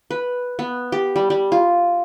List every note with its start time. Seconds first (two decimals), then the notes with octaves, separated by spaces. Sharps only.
0.11 B4
0.59 B3
0.92 G4
1.16 G3
1.30 G3
1.52 F4